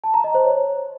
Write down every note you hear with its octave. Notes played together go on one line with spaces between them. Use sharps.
A5
A#5
D#5
C5
C#5